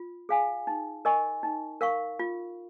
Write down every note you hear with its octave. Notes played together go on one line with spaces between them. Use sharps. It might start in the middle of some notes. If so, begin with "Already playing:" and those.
Already playing: F4
G#4 F5 G#5
D#4
A#4 D#5 G#5 C#6
D#4
A#4 F5 C#6
F4